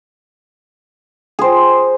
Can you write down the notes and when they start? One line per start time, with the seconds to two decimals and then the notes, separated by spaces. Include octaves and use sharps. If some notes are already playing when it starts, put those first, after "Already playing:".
1.39 G#4 C5